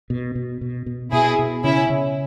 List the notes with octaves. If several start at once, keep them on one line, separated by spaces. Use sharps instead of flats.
B2
B2
B2
B2
B2 E4 G#4
B2
C#3 C#4 E4
C#3